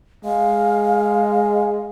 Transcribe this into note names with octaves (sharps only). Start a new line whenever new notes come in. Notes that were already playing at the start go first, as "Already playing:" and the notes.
G#3 F5